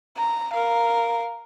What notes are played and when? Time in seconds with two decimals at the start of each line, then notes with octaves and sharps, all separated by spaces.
0.17 A#5
0.53 A#4 F5